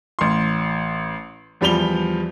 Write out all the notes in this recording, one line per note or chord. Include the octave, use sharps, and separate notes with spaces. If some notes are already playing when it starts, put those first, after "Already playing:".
A1 C6
E2 F3 G3 B5 F7 G7